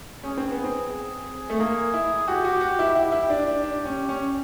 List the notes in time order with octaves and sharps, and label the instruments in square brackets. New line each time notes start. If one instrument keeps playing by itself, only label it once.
[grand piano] C#4 [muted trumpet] G#4
[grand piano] C4
B3
C4
[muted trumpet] G#4
[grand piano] A3
[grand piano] A#3 [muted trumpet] G#4
[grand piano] E4
[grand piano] F#4 [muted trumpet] G4
[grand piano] F#4
F#4
E4
[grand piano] E4 [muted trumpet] G4
[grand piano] E4
D4
D4
D4
C#4
C#4